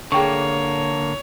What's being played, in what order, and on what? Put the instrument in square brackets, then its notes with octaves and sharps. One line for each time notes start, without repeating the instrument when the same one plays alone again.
[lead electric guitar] D3 A#3 [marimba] G#4 G5 C#6 [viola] C#5